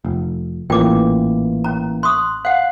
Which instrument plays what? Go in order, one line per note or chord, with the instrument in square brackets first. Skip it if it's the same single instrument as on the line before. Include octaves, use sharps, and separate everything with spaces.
[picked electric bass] F1
[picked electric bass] A1 A#2 [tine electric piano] E3 A#3 [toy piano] G5 D6
[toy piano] C#4 A#5
[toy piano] C6 C#6 D#6 [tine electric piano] F#6
[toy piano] F5 F#5 [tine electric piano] F#6